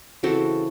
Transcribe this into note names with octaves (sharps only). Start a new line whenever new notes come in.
C#3 E3 C4 F#4 A4